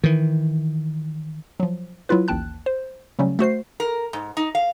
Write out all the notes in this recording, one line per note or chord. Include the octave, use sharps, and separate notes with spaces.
D#3 E3
F3 F#3
F#3 E4 F4 B4
A1 D#2 G5 A5 F#6
C5
C#3 F#3 G3 A3 C#4
A3 F#4 C5 C7
A#4
G#2
D#4
F5